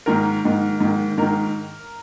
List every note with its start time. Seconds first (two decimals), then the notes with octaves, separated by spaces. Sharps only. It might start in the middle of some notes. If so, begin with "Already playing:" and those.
0.06 G#2 D#3 A#4
0.45 G#2 D#3
0.81 G#2 D#3
1.18 G#2 D#3 A#4